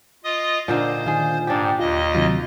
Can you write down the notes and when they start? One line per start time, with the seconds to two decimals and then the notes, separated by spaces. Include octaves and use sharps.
0.24 F4 D#5 D#6
0.68 A#2 D3 D#4 C5
1.06 D#3 F4 G#4
1.47 G#2 D4 G4 G5 A6
1.79 D#2 F4 D#5
2.15 C3 D#3 F#3 F4